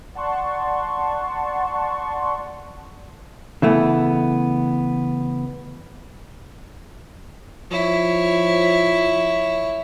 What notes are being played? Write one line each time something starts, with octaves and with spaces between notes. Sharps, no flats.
D5 F#5 A5 C6 C#6
C#3 E3 A3 B3
F3 E4 C#5